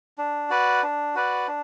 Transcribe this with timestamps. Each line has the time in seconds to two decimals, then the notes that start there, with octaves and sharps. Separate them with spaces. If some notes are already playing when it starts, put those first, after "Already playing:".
0.18 D4
0.50 F#4 B4 D5
0.83 D4
1.15 F#4 B4 D5
1.48 D4